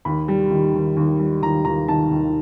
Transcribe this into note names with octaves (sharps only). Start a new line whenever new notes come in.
D#2 B5
G3
D#3
D#2
D#2
G3
D#2 A#5
D#2 A#5
D#3 A5
D#2